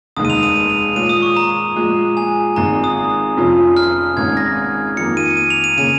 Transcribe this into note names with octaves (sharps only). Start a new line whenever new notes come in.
F1 D#2 D#3 G#3 D#6
D#7
F7
D#7
D#7
F7
A#2 G#3 F4 C#5 D#7
D#6
C#6
A#5
A#2 F3 G#3
G#5
G#1 G#2 F3 G#3 A#5
D#6
F1 F2 F3 C#4 F4
F6
G#1 G#2 G#3 C#4 G#6
A#6
F2 D#3 A#3 C#7
D#7
D#7
F7
D#7
C#3 A#3 C#4 D#7